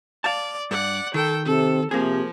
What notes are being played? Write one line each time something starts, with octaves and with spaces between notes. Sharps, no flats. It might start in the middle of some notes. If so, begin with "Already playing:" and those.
D5 F5 A5
G2 D5 F#5
D#3 A4 G5
C3 A4
C3 F3 A#3 G#4